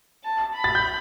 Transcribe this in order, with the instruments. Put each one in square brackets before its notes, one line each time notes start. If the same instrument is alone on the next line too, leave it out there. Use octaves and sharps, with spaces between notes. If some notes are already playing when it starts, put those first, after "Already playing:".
[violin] A5
B5
[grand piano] A6
G6